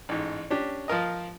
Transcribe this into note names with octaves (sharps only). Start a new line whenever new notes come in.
A1 G#2
C#4 D4 G4
F3 F4 A#4 D#5